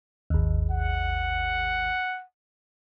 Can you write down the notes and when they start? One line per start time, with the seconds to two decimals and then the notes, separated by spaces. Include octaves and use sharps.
0.30 G#1 D#2
0.71 F#5